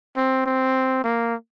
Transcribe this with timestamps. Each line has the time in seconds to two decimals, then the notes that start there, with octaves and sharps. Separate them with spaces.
0.17 C4
0.46 C4
1.04 A#3